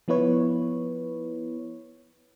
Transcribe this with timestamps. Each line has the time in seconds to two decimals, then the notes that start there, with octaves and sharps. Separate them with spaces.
0.08 F3 B3 E4 B4 C#5